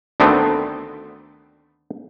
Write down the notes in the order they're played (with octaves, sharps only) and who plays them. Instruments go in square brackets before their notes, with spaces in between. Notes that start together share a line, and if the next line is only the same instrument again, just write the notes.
[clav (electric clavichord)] D2 D3 D#3 A3 B3 C4